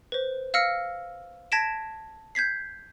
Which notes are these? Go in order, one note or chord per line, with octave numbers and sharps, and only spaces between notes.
B4 C5
F5 E6 F6 A#6 C#7
A5 G#6 A#6 B6 D7 E7
G6 G#6 B6 C7